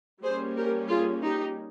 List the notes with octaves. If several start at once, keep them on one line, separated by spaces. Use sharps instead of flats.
G3 A#3 C#4 G#4 C5
G4 A#4
F4 G#4
D#4 G4